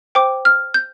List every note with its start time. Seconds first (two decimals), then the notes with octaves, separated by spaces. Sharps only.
0.15 C5 G5 D6
0.45 F6
0.74 G6